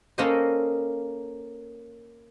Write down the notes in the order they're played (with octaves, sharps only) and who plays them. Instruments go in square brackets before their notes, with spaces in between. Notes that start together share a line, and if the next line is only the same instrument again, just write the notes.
[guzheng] A#3 C#4 A4 A#4 C5 D#5